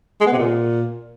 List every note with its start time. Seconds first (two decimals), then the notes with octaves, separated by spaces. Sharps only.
0.21 G#3
0.27 B3
0.32 C3
0.38 A#2